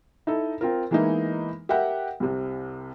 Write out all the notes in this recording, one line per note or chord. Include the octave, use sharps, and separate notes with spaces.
D#4 E4 A4
C4 F4 A#4
E3 G#3 A#3 B3 D#4 E4
G4 A#4 E5 F#5 G5
C2 C3